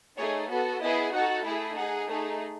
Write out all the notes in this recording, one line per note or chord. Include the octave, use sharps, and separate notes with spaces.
A3 D#4 G#4 C#5
B3 F#4 A4
B3 E4 G#4 D#5
D#4 F#4 A4 F#5
A3 E4 G#4
D#4 G#4 F#5
A3 D#4 G#4